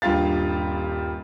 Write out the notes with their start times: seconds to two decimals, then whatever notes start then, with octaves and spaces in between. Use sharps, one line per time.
0.02 D#1 G2 F4 G4 F5 A6